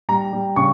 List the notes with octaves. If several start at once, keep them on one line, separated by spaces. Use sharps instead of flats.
G3 A#5
G3
C#3 C#6